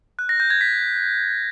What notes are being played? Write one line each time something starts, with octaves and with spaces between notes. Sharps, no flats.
F#6
A#6
G6
G#6
B6